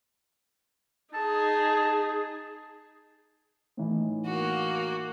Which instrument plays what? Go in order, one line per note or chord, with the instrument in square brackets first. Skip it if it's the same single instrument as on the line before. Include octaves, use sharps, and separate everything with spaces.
[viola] D#4 G#4 [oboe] A5
[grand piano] A2 E3 D#4
[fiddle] A#3 F#4